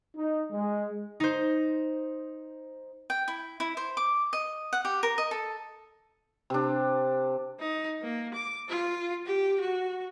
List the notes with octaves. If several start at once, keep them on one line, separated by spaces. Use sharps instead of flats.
D#4
G#3
D#4 C5
G5
E4
E4
C5
D6
D#5
F#5
G4
A#4
D#5
A4
C3 D4
D#4
A#3
D6
F4
G4
F#4